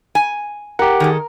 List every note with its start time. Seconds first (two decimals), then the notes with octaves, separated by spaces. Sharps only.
0.15 G#5
0.79 G4 A#4 F#5
1.00 D#3 G#4 A4